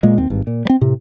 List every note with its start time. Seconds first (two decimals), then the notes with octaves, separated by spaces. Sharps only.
0.03 A#2 G#3 A#3
0.18 D#2 C4
0.30 G#1 G2
0.47 A#2
0.65 G3 C4
0.81 A2 C3